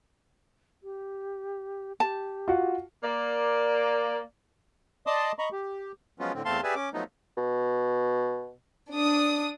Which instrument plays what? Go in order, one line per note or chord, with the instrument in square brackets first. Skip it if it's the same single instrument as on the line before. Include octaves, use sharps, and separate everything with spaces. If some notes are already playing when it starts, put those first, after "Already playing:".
[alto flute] G4
[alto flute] G4 [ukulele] A5
[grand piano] F4 F#4
[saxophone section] A#3 D5
[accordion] D5 D#5 A5 C6 D6 D#6
D#5 A#5 B5 C#6
G4
F3 F#3 G#3 B3 C#4 F4
A2 D3 C4
E2 A3 C4 F5 A5 C6
G4 G#4 B4 D5 E5 G#5
C#4 D6
F3 F#3 A3 B3 D#4
[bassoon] B2
[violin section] D4 D#6